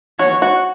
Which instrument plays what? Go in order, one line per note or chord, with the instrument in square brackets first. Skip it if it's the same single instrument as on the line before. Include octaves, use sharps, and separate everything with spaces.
[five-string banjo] F#4 [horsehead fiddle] C#5
[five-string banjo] F#4